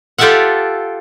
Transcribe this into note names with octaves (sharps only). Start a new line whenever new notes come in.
F4 G4 A4 D5 E5 F#5